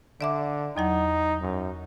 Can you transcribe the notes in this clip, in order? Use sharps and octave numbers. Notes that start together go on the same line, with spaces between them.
D3 D5 E5 D6
E2 F#3 D#4 F#5
F#2